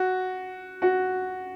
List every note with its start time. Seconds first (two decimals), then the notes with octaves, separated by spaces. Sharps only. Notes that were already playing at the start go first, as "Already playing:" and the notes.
Already playing: F#4
0.82 F#4